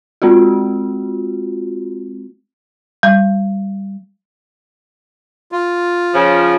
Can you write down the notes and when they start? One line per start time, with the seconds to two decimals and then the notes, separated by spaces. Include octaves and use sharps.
0.22 G#3 C4 F4 F#4
3.03 G3
5.52 F4
6.14 C#3 F3